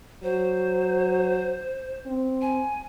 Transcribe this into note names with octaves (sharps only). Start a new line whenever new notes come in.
F#3 C5
C4
G#5